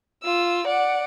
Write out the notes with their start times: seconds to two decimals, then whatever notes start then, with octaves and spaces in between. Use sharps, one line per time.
0.24 F4 E6
0.67 D5 F#5